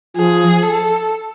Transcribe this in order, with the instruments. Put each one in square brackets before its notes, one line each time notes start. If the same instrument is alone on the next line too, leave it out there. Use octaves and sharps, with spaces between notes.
[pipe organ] F3 [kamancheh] G#4
[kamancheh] A4